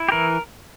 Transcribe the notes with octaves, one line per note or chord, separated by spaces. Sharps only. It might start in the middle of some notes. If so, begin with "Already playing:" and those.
Already playing: E4
G4
E3 A#4